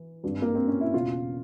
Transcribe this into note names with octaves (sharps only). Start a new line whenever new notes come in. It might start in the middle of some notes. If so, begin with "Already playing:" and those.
Already playing: E3
G#1 G2 G3
A#3
C4
C#4
E4
E1 E2 C#3 F4